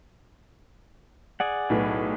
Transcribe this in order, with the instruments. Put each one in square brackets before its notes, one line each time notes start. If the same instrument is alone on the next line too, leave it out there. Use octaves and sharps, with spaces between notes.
[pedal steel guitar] G#4 D5 F#5
[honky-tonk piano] B1 A2 B4